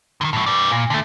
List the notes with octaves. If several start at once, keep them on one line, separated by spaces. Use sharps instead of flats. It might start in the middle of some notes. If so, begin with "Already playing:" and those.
D3 D#3
A2 F#3
B4 D5
A#2
D3 A3